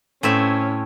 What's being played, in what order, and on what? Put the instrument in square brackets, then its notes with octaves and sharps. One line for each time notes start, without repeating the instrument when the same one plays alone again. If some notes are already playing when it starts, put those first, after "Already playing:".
[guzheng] A2 C4 E5 [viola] C#4